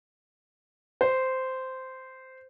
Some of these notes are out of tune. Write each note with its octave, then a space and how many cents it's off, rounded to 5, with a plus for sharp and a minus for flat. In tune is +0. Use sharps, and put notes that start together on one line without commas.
C5 -10